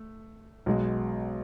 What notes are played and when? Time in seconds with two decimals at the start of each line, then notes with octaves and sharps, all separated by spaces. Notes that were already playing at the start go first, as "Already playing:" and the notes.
Already playing: A3
0.66 B1 B2 G#3